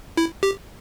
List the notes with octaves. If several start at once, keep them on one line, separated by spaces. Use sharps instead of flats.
E4
G4